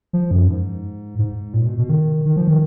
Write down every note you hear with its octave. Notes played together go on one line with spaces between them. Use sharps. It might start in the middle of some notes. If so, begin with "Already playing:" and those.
F3
F#2
G#2
G#2
A#2
B2
B2
D#3
D#3
F3
D#3